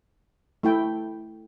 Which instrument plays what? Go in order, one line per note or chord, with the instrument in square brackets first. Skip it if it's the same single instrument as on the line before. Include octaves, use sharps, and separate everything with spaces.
[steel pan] A3 E4 G5